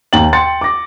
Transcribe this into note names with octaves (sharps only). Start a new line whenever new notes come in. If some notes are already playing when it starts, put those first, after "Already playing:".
D#2 G5 A#5 A6 F#7
G5 C6 A6 C#7
D6 A#6